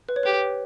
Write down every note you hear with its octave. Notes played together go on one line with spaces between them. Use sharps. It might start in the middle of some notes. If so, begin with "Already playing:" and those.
B4
C#5
G4 B4